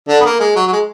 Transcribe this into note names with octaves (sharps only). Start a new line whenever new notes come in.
D3 D4
B3
A#3
G#3
F#3
F#3
G#3